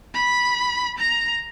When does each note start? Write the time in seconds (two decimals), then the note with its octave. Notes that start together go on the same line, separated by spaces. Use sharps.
0.14 B5
0.99 A#5